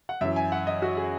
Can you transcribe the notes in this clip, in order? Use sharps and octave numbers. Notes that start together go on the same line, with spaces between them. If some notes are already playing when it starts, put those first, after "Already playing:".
F#5
F#2 E3 E5
G#5
F#5
D#5
F#4
G#4